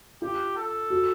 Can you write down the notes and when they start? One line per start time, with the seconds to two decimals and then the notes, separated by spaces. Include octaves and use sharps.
0.22 F4 G4
0.57 A4
0.90 F#4